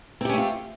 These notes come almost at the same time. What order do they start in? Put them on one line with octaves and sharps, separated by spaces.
C4 G4 C#4 A3 F4